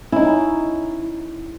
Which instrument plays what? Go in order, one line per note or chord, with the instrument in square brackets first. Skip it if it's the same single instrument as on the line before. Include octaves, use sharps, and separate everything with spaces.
[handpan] C#4 D#4 [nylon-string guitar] E4